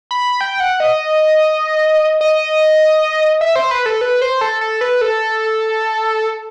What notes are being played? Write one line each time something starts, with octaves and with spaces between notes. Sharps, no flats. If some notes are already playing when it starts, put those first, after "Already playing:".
B5
G5
F#5
D#5
D#5
E5
C5
B4
A4
B4
C5
A4
A4
B4
A4